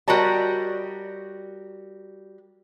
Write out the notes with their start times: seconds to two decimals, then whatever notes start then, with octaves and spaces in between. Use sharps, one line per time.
0.08 G3 F#4 A#4 C#5 D#5 A5